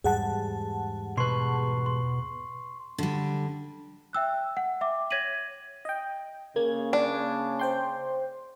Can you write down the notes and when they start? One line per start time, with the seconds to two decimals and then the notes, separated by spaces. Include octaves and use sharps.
0.04 E2 G#2 G3 G#4 F#5 A5
1.17 B2 B4 C6 C#6 C7
1.86 C6
2.98 D3 G3
4.13 E5 G5 E6 F#6
4.57 F#5
4.81 E5 G5 D6
5.10 C#5 G#6 A#6 B6 D#7 F#7
5.85 D#5 G5
6.56 C#3 A#3 G#6
6.93 D4
7.59 C5 G5 C6